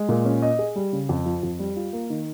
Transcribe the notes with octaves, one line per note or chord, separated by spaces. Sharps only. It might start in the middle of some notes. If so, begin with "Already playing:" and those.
Already playing: G#3
A#2
C#4
D#5
G#4
G3
C#3
F2
F3
F2
G3
F4
A#3
D#3